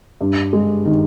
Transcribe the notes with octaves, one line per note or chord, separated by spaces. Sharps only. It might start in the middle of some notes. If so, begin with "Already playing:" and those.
G2
G#3
D#3